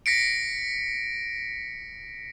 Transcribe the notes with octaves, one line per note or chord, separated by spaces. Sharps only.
A#6 B6 C#7 D7